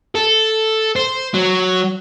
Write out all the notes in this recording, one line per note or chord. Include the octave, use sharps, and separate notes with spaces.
A4
C5
F#3